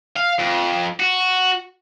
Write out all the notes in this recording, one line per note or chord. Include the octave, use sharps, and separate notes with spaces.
F5
F2
F#4